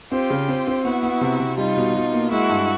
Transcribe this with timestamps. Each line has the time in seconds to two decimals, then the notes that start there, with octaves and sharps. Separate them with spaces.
0.12 C4 F4 G4
0.30 C#3
0.48 C4
0.67 C4
0.85 B3 E4 F#4
1.03 B3
1.21 C3
1.40 C3
1.58 G3 D#4 F4
1.77 B2
1.95 B2
2.13 A#3
2.31 G#3 E4 F#4
2.49 G2